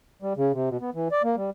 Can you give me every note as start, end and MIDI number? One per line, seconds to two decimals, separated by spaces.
0.22 0.33 55
0.37 0.52 49
0.53 0.69 48
0.69 0.77 47
0.81 0.90 59
0.94 1.08 52
1.12 1.22 74
1.23 1.36 58
1.36 1.50 55